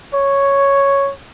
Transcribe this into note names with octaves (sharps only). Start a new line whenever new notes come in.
C#5